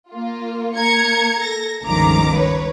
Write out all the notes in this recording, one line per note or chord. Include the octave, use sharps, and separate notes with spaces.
A#3 F4
A#3 A#5 G#6 C#7
A4 A#6
G1 C#2 D#3 F3 A#5 D6
B4 C#5